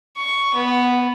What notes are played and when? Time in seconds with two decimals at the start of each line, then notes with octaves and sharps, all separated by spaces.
0.17 C#6
0.54 B3